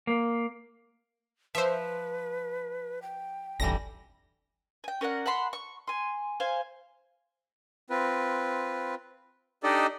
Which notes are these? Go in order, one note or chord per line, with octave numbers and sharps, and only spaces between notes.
A#3
F3 B4 C5 E5
G5
D#1 G#1 D3 E3 G3 A#6
G5 G#5
C#4 A#4 D5 F#5
F#5 A5 B5 C6
C#6
G#5 C6
C5 F5 G#5
C4 F4 B4
D4 D#4 G4 A4 D5 D#5